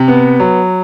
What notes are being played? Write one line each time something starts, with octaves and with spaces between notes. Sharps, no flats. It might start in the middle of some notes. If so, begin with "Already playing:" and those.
Already playing: C3
B3
F#3